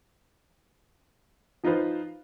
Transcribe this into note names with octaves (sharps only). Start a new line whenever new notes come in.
F3 D#4 F4 B4 C5